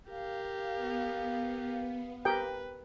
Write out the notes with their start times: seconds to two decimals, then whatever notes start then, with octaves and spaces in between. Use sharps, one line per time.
0.11 G4 A#4 F5
0.75 B3
2.25 G4 A#4 B4 G5